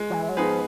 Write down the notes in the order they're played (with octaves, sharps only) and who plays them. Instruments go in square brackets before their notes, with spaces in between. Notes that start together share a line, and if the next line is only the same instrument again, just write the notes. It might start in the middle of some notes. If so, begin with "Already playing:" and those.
Already playing: [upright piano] G#3
[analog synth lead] F3
E3
F#3
[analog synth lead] F3 [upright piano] B3 D#4 G#4 B4